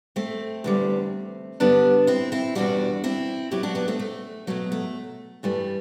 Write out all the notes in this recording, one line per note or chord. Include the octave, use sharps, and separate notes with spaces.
A3 C4
E2 D3 G3
G2 D3 G3 B3 D4
C4 E4
C4 E4
E2 B2 G3 D4 F#4
C4 E4
B2 F#3 E4 G4
D4 F#4
B3 D4
A3 C4
A3
B2 F#3 A3
A3
G2 E3 G3 A3